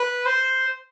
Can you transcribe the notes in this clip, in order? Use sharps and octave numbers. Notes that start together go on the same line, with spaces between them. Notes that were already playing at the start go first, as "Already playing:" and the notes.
Already playing: B4
C5